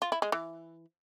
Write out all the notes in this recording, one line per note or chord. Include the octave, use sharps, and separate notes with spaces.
F4
E4
G#3
E3